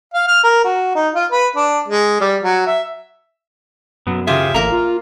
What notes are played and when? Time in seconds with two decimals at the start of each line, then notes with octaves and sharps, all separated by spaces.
0.14 F5
0.27 F6
0.44 A#4
0.64 F#4
0.95 D#4
1.15 F4
1.32 B4
1.56 D4
1.88 G#3
2.21 G3
2.43 F#3
2.66 E5
4.07 F#2 F#3 B3
4.27 C#3 F4 G4 G#4 E5
4.54 A1 A#3 A#4 A#5
4.72 F4